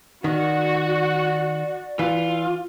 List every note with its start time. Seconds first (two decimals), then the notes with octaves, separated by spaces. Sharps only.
0.24 D#3 F#4 D5
1.99 E3 F4